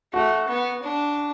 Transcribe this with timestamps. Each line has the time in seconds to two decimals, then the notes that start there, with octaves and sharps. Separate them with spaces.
0.13 A3 F#4
0.48 B3
0.83 D4